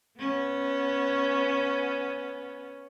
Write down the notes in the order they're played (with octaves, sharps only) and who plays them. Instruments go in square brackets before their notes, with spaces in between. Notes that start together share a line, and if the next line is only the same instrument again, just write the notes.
[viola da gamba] B3 C#4